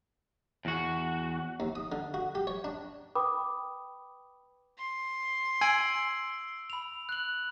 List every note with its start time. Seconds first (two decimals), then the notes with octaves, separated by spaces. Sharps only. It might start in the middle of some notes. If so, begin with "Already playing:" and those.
0.65 E2 F#4
1.60 D#2
1.75 D#6
1.92 D3
2.14 F#4
2.35 G4
2.47 C#5
2.64 D4
3.15 B4 G5 B5 D6 D#6
4.78 C6
5.61 G#5 E6 D7 F#7
6.70 B5 F7
7.09 F#6 F#7